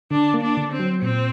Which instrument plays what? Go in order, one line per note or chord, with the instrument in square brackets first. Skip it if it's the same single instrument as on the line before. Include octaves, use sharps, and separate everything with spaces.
[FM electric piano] D3 [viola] D4
[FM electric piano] A#3
[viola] D4
[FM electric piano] D3
[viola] C4
[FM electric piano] F#3
[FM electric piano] A#2 [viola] C4